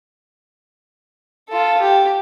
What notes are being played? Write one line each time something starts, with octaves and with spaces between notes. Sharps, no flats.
F4 A4
G4